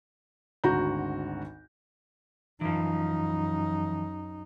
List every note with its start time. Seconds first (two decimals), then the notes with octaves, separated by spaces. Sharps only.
0.64 G#1 D2 F#4 A#5 G6
2.61 F#2 E3 F3 D#4